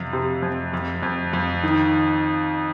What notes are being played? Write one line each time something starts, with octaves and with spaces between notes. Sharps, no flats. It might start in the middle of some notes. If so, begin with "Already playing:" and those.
Already playing: F2 C3
C3
F2
F2
F2
F2
D#3